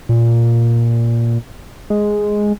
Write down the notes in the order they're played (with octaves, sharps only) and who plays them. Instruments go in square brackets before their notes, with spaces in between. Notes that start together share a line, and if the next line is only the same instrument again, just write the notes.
[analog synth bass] A#2
G#3